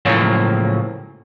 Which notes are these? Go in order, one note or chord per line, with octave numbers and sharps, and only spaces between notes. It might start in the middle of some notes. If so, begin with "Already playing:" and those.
A2 C#3 F3 F#3 G#3 A#3